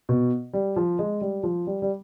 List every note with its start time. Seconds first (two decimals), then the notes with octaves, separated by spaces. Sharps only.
0.09 B2
0.53 G3
0.76 F3
0.99 G#3
1.21 G3
1.43 F3
1.67 G3
1.82 G3